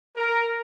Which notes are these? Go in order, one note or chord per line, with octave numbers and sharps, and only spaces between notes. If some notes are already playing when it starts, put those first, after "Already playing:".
A#4